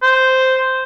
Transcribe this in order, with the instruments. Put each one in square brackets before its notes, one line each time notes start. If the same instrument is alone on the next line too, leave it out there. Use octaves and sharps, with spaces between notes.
[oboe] C5